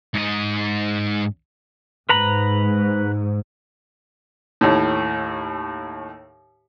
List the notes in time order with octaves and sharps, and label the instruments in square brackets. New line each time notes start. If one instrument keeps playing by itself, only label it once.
[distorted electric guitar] G#2 D#5
[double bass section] G#2 [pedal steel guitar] B4 A#5 B5
[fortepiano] D#2 A2